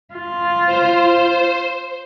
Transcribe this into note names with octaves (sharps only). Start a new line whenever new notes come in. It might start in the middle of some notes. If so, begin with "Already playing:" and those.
F4
C5